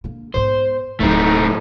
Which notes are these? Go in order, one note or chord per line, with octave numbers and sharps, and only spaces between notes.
D3 A#3
G#2 B3 C5
D1 A2 F#3 G#3 A3 C4 D#4